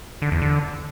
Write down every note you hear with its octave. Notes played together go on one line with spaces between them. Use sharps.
D3
E2
D3